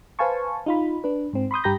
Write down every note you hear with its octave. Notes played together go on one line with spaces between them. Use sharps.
B4 C5 F5 G#5 A5 C#6
D#4 F4 B5
D4 B4
G#2 C4
B5 C6 D#6 G6
G2 G4 A#5 B5 G6 A#6